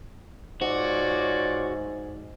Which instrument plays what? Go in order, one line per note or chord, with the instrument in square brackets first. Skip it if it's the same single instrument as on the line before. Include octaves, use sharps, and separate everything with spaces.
[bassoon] G#2 [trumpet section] F4 C#5 D5 [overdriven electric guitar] F#4